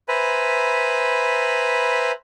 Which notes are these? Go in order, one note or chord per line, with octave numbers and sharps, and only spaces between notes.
B4 C5 E5 G#5 A#5 B5